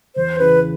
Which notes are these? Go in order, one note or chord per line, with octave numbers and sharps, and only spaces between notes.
E2 C5
C#3 E3 B4